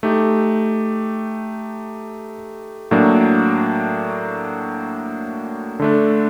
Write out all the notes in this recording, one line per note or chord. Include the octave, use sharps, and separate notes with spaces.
A3 D#4 G4
A2 F#3 A#3 D4
D3 A3 D4